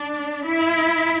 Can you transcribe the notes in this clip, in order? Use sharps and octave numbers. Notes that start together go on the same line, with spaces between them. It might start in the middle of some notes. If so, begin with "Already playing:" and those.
Already playing: D4
E4